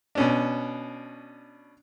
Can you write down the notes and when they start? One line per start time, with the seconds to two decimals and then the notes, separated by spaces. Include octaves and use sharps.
0.15 B2 C#4 D4